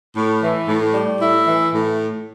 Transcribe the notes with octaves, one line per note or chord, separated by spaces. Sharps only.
A2
E3
A2
G3
A2 E4
E3
A2